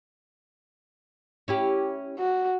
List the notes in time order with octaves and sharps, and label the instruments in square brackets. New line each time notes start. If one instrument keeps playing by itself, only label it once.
[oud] C#4 E4 G4
[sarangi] F#4